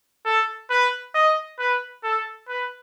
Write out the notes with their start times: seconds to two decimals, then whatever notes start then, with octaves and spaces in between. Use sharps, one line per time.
0.25 A4
0.70 B4
1.15 D#5
1.59 B4
2.03 A4
2.48 B4